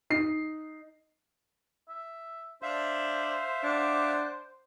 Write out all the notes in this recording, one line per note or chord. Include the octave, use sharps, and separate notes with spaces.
D#4 C7
E5
D4 C5 E5 F5
D4 F#5 D6